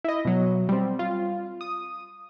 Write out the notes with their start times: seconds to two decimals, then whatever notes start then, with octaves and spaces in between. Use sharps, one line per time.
0.04 E4 D#5
0.25 B2 F#3
0.69 G3 C4
0.99 F4
1.61 D#6